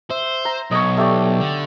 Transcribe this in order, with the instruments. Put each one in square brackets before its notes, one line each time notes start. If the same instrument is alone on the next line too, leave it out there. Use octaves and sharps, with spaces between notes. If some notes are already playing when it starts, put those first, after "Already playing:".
[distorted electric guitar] C5 [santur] E5
[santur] A#5
[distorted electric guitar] B1 [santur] C#5 D#5
[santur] A3 G4 D5
[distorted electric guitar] D3